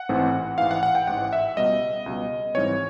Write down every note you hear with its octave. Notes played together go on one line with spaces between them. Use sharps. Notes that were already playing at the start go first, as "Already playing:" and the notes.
Already playing: F#5
A1 G#2 E3 A3 C4
A1 G#2 E3 F5
F#5
F#5
G5
A1 G#2 E3 F#5
E5
C#2 B2 G3 D#5
C#2 B2 G3
G#1 G#2 E3 G3 C4 C#5